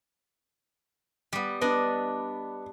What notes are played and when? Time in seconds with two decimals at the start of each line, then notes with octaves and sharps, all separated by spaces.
1.33 G3 B3
1.61 B3 D4 D5 D#5